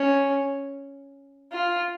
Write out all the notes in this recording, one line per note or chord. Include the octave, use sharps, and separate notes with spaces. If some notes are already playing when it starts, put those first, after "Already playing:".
Already playing: C#4
F4